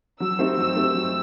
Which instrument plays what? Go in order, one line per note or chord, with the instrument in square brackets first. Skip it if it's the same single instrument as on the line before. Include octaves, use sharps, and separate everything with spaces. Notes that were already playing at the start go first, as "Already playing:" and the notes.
[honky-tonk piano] F#3 [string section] E6
[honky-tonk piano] A3 C4 D#4 G4
[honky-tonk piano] F#3 [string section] E6
[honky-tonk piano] A3 C4 D#4 G4
F#3